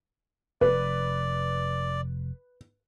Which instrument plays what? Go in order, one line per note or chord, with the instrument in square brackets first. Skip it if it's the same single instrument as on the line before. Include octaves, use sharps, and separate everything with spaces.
[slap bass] F1 [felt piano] B4 [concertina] D5